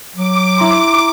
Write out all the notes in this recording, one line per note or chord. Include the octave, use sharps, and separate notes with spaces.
F#3 D6
E4 A#5 C6